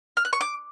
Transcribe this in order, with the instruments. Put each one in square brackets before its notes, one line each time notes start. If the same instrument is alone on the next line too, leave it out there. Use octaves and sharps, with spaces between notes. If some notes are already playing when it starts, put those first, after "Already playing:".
[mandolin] F6
F#6
C#6
D6